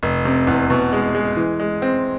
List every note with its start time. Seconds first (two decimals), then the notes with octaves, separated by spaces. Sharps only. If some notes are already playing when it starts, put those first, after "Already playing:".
0.03 F1
0.25 C3
0.47 E2
0.70 B2
0.93 G#3
1.15 G#3
1.37 E3
1.60 G#3
1.82 C4